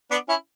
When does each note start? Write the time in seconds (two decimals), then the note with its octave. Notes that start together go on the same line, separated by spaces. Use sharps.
0.11 B3 D4
0.28 C#4 E4